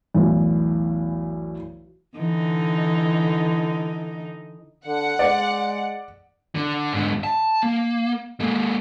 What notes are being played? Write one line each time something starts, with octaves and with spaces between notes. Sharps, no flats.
B1 E2 A2 E3
D3 E3 D#4
D3 F#5
G#3 D5
D3
G#2 D3
A5
A#3
G#3 A#3